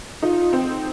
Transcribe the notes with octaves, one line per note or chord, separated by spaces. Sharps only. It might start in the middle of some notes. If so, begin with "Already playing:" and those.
D#4 F4
C4